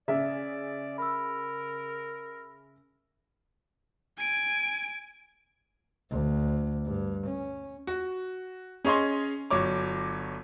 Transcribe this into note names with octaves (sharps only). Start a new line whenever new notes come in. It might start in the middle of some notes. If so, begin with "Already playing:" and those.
C#3 D5 E5
A#4 B5 E6
G#5 D7
D2
G2
C#4
F#4
C#4 G#4 C#5 D#5 C6
G1 F#3 C#5 D6